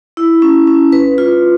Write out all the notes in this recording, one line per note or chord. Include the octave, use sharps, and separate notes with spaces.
E4
C#4
C#4
B4
F4